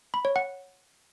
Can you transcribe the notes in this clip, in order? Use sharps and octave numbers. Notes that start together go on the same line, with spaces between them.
B5
C#5
F#5